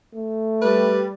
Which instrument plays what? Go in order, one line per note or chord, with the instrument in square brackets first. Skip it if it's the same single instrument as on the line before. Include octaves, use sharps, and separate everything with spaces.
[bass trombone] A3
[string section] G3 [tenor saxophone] B4